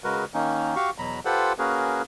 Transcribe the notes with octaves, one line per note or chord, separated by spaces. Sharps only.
C#3 G#3 F#4 A#4 B4
D#3 A#3 C#4 D#4
F#4 G4 F5 C#6
E2 B2 F#3 A#5 B5
F4 G4 A4 B4 C5 F#5
A#3 C#4 F#4 G#4 A#4 B4